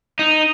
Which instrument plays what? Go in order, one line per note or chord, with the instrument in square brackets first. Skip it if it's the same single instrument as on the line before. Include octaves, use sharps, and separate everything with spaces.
[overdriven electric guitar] D#4